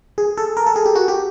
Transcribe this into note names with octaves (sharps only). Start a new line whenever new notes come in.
G#4
A4
A#4
A4
G#4
G4
F#4
G4